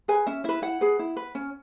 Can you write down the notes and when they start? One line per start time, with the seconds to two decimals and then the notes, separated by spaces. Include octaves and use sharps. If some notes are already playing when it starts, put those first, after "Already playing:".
0.08 G#4 B4 G#5
0.27 C#4 E5
0.44 E4 B4 E5
0.62 E4 F#5
0.81 G#4 B4
0.99 E4
1.16 B4
1.35 C#4